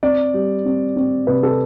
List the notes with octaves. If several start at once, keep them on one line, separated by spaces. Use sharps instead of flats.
C4 D5
G3
C4
C4
C3 B4
A4